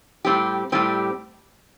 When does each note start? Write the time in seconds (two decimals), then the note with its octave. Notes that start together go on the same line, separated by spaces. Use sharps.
0.25 A2 G3 C4 G4
0.72 A2 G3 C4 G4